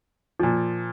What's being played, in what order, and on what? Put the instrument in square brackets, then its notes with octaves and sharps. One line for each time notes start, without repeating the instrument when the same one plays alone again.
[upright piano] A#2 F3